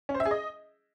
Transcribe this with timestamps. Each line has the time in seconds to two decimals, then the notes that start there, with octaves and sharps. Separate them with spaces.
0.09 C#4
0.14 C5
0.20 E5
0.25 G#4
0.31 D#5